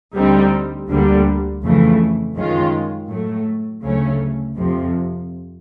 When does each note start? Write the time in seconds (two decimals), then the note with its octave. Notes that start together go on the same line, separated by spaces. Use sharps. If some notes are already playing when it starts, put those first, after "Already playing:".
0.15 D2 D3 G3 C4 D#4
0.88 D2 D3 G3 A#3
1.62 F2 C#3 E3 A3
2.36 F#2 D#3 G#3 C#4 F4
3.09 A2 F#3 A3
3.83 D2 C#3 F#3 A3 C#4
4.56 F2 C3 F3